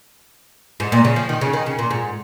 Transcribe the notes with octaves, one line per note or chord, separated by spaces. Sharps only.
G#2
A#2
C#3
F3
D#3
C#3
D#3
C#3
A#2
G#2